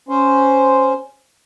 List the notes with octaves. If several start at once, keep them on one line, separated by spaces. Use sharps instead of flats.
C#4 C5